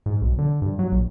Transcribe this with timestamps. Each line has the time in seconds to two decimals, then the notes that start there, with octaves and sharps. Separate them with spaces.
0.06 G#2
0.22 B1
0.38 D3
0.62 G2
0.79 F#3
0.92 A#1